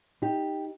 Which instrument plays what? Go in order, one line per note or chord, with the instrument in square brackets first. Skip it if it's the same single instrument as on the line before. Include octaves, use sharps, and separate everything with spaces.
[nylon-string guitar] D#4 G4